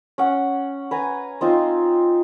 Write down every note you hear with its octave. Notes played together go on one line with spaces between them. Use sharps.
C#4 F#5
B4 G#5 A#5
C4 D#4 F4